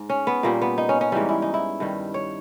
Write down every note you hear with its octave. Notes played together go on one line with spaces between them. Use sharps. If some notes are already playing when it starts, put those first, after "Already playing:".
Already playing: G#2
C#4
B3
A#2 G3 A#3
B3
D#4
C#4
C#4
G#2 E3 G3 D#4
E4
D#4
E4
G2 D#3 G3
C#5